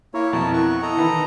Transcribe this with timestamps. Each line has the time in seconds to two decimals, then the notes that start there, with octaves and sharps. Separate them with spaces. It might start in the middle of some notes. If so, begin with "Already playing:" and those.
0.14 A#3 E4 A#4 C#5
0.33 F2 B2 A#4 A5
0.53 F#5 C#6
0.82 A4 D#5 A#5
0.97 D#3 E3 B3